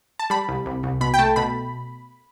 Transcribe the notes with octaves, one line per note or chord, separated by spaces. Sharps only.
A5
G3 B5
C2
C2
C2
B2 B5
G5
A3 A5
B2 B5